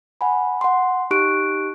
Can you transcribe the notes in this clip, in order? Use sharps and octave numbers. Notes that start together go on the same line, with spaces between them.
F#5 G#5 B5
F#5 C6
D#4 G4 C#6 F#6 D7